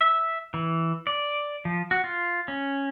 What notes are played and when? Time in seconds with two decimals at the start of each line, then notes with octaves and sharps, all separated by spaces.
0.01 E5
0.54 E3
1.07 D5
1.65 F3
1.91 F#4
2.04 F4
2.48 C#4